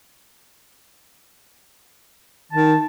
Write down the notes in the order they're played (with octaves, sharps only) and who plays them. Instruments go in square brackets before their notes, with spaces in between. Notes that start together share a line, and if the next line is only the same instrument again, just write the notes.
[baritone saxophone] D#3 [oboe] A5